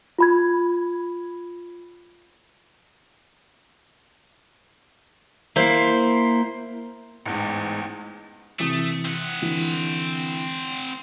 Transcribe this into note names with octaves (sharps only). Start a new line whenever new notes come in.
F4 B5 G#6
A#3 E4 C5
A1 E2 G#2
C3 E3 A3 D#6
C4 F#5
D3 E3